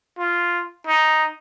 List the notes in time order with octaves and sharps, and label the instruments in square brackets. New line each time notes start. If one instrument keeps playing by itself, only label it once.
[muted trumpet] F4
D#4